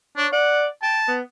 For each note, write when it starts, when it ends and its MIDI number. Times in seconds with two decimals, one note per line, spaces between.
0.17 0.27 62
0.17 0.31 73
0.33 0.67 74
0.33 0.65 78
0.82 1.00 79
0.82 1.15 81
1.08 1.21 59